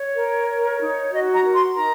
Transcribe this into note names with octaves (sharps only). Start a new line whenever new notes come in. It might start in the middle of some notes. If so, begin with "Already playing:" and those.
Already playing: C#5
A#4
C#5
D#4
F#4 D#5
A#5
A#4
C6
D#4 A#5